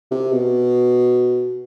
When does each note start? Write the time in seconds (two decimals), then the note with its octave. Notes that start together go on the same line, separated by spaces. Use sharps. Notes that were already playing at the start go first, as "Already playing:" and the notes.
0.11 C3
0.32 B2